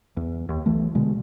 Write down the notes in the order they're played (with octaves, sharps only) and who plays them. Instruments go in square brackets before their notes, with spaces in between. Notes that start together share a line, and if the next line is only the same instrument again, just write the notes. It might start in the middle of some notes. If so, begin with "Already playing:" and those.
[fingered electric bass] E2
D#2
B1 E3 A3
B2 D3 G#3